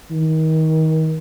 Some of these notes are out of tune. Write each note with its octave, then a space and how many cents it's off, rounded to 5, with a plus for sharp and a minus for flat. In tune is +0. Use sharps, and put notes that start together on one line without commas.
D#3 +30